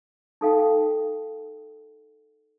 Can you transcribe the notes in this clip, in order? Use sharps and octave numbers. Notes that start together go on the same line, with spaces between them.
D#4 A4 F5 G5